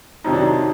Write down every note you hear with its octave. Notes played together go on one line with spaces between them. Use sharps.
F2 C3 D#3 F#3 D#4
D4
D#4